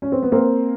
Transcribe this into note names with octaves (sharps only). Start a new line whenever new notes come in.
C#4
C4
B3
A#3 C4